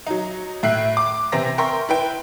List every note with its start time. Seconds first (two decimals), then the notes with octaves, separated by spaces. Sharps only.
0.07 F#3 D#4
0.63 A2 E5 F#6 C7
0.97 D6
1.32 C3 E3 C4 E5 A#5 A#6
1.58 A#4 E5 G5 C6 C#6
1.89 E4 B4 G5